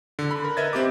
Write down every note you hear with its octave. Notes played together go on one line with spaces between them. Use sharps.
D3
B5
A#4
A#4 B4 D#5 E5 G#6 A6
C4 G4 D#5 D6